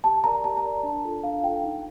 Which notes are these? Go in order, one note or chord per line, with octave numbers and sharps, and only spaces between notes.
G4 A5
A#4 D5 A#5
G4 A5
A#5
A#4 D5
D4
F4 A4
D4 F5
F4 A4 G5
D#4